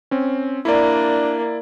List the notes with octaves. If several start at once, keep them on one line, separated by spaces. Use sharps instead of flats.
C4 C#4
A#3 D4 E4 D5